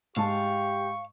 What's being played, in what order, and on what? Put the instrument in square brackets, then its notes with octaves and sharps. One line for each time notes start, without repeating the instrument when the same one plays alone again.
[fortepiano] G#2 A5 [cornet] G4 [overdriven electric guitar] F5 [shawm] C#6